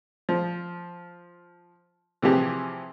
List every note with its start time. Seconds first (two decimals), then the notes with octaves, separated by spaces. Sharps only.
0.29 F3
2.22 C3 E3 F3 G4 G#4